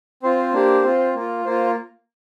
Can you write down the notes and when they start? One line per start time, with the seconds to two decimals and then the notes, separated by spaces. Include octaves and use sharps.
0.23 C4 F4 C5
0.54 A#3 D4 G4
0.83 C4 F4
1.15 A#3 F4
1.45 A#3 F4 C5